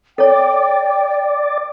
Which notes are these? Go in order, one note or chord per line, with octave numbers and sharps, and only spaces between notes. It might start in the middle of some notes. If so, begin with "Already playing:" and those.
A4 C#5 D5 G5